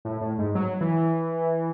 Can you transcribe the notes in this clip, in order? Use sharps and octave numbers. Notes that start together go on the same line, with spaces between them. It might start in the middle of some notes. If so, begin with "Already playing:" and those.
A2
A2
G#2
F#3
E3